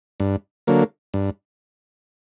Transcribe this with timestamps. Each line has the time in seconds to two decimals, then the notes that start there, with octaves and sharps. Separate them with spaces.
0.20 G2
0.67 D3 F#3 A#3
1.14 G2